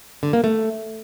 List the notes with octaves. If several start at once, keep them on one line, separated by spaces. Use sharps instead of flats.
D3
A#3
A3